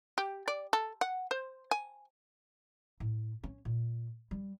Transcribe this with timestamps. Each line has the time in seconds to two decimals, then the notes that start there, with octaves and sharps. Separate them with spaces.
0.18 G4
0.48 D5
0.73 A4
1.01 F#5
1.31 C5
1.71 G#5
3.00 A2
3.44 C#4
3.65 A#2
4.31 G3